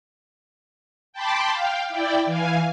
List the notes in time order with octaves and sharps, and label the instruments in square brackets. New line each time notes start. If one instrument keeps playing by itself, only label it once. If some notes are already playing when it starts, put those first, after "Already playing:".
[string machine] G5 A5 B5 C6 D6
F5 G5
E4 D5 G5
E3 F5 G#5